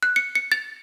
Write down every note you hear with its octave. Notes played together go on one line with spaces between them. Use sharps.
F#6
C#7
C#7
A6